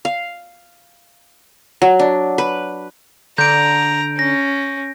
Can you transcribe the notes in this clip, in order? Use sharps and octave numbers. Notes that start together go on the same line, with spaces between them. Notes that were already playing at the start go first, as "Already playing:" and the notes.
F5
F#3
D4
B4
D3 A#5 G6 D7
C#4 A#6